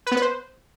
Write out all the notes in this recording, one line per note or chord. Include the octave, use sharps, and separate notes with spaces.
B4
B3
B4
C5